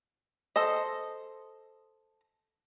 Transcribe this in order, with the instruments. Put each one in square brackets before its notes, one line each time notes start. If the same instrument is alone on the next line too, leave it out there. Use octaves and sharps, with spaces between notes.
[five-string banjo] A4 C5 D#5